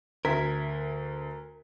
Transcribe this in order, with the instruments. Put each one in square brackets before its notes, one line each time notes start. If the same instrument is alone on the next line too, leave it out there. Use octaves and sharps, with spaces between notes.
[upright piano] D2 G#6 B6 [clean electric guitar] A#4